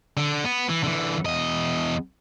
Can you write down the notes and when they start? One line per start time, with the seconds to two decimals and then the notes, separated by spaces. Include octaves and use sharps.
0.17 D3
0.45 B3
0.69 E3
0.83 D3 E3
1.26 E2 D#5